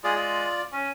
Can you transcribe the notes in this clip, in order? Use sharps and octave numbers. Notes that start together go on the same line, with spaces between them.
G#3 F4 G#4 D5
F4 D5
C#4